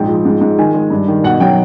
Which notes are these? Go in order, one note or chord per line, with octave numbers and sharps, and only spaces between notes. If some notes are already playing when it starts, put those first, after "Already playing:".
Already playing: A#1 G#2 G5
F3
G#2
G#2
D#3 G#5
G#3
G2
D#3
B2 F#5
F#3 G5